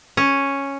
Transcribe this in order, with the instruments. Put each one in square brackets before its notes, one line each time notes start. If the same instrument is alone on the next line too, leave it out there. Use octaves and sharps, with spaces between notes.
[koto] C#4